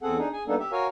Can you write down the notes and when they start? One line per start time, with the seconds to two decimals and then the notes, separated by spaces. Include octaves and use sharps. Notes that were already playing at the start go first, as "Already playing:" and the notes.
0.02 E2 C4 G#4 A4 F#5
0.18 D4 D#4 G#4
0.33 G#4 G#5
0.47 G3 A#3 B3 D4 D#4 A4
0.59 G4 E5
0.72 F#4 A#4 C#5 F5 G#5